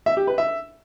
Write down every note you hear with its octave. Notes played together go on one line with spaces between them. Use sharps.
E5
G4
B4
E5